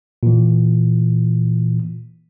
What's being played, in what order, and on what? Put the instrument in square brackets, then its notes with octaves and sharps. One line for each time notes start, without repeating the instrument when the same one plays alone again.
[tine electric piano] A#2 E3